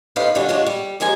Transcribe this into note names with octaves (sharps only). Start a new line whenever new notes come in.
A2 D#4 F4 G4 B4 F5
G2 D3 F#3 G3 C#4 F4
G#3 C#4 D4 F4 F#4
G3
D#2 F3 G#3 G#5 A#5